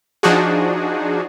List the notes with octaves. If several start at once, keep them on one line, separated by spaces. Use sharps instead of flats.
F3 D4 D#4 F#4 G#4